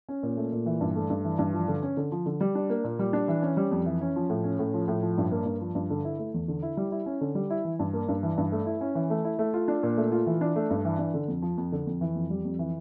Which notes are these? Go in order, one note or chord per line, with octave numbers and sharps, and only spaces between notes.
C#4
A#2
A3
A#2
E3
G2
A3
G2
E3
G2
F3
D3
C#4
D3
F3
D3
G3
D4
A#3
A#2
G3
D4
E3
C#4
G3
F2
E3
C#4
F3
A2
C#4
A2
F3
A2
F3
G2
A#3
G2
F3
G2
D3
E4
A3
E2
D3
E4
G3
E4
C#4
D3
G3
E4
E3
G2
A#3
G2
E3
G2
A3
E4
C#4
E3
A3
E4
A3
F4
D4
A#2
A3
F4
E3
D4
A3
G2
E3
D4
D3
F2
F3
F2
D3
F2
E3
F2
G3
F2
E3